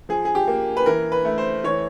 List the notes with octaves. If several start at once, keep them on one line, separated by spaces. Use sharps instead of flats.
F3 G#4
G#4
G4
A#3
B4
E3 A#4
B4
A3
C5
E3 C#5